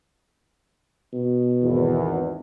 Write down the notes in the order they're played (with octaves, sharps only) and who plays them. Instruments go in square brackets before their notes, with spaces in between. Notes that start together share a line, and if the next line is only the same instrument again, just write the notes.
[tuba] B2
[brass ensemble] G#1 E2